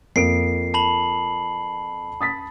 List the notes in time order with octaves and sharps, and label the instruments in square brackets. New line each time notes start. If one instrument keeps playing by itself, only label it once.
[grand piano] F2 A#3 D7 [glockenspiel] C7
[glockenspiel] A5 B5 F#7
[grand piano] D#6 A6 B6